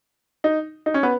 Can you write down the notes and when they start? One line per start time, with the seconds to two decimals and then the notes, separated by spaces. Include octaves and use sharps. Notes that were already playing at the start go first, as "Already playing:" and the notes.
0.44 D#4
0.86 D#4
0.94 C#4
1.03 B3